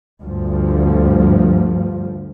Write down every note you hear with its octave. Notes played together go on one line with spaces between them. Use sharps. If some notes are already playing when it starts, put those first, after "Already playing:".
D2 G2 F3